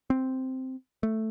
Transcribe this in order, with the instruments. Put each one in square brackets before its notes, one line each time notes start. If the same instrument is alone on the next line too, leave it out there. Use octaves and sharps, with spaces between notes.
[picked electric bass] C4
A3